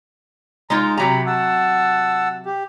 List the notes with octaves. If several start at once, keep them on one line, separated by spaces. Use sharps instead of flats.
G#3 D#4 F4 A#5
C3 F#3 G4 A#5 B5
F#5 A5 E6
G4